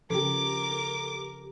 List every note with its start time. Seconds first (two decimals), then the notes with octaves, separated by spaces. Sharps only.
0.10 C#3 F3 G4 A4 A#4 D6